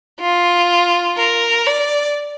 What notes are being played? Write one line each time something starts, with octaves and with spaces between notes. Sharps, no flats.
F4
A#4
D5